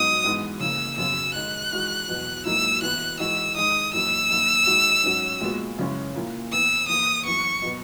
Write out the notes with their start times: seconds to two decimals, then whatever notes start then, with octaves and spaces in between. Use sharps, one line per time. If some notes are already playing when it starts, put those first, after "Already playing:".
Already playing: G#2 F#3 B3 D#4 D#6
0.24 G#2 E3 G#3 B3
0.60 C#3 E3 A#3 E6
0.97 F#2 C#3 F#3 B3 E6
1.34 D#3 G#3 D#4 F#6
1.72 E3 G#3 D#4 F#4
2.08 E2 B2 F#3
2.45 G#2 F#3 A#3 E4 E6
2.82 E3 B3 E4 F#6
3.19 E3 G#3 D#4 F#4 E6
3.56 D#3 G#3 D#4 D#6
3.93 F#2 E3 A#3 D#4 F#4 E6
4.30 F#2 D#3 A#3
4.67 D#3 G#3 D#4 F#4
5.03 G#2 F#3 C#4 F#4
5.40 A#2 G#3 B3 F#4
5.78 F#2 C#3 G#3 C#4 E4
6.14 A#2 A#3 E4
6.52 E3 B3 E4 E6
6.88 E3 A#3 E4 D#6
7.25 F#2 E3 B3 C#6
7.62 B2 F#3 B3